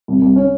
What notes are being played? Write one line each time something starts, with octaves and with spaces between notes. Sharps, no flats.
C2
C2
C#4